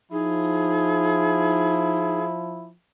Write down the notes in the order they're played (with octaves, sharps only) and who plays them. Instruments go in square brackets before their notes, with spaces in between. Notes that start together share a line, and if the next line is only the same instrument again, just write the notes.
[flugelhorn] F3 [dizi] D#4 [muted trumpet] E4 [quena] G#4